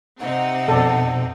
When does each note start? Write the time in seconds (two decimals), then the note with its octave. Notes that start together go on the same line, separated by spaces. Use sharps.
0.20 C3 C4 D#4 F#5
0.68 F2 B2 A4 D5